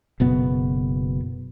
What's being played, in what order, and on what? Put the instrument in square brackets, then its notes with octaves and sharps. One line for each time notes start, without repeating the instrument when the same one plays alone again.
[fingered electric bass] F#1 B2 B3